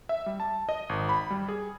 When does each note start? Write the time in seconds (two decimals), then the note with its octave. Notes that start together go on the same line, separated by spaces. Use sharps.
0.09 E5
0.26 G3
0.40 A5
0.69 D#5
0.89 G#1
1.09 B5
1.30 G3
1.49 G#4